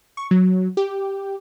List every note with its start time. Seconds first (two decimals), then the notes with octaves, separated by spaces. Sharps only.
0.17 C#6
0.31 F#3
0.77 G4